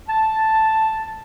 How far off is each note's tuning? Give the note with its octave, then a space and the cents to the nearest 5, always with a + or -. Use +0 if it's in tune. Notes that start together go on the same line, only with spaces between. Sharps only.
A5 +0